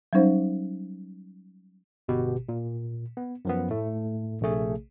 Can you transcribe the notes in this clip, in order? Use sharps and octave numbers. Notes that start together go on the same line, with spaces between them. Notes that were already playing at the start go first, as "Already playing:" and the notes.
F#3 G3 C#4 D#4 C5
G1 B2 G4
A#2
B3
F#2 F3 B3
A2 A3
A#1 C3 A3 G#4